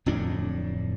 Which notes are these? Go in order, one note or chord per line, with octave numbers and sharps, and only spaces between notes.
D1 F2 A2 D4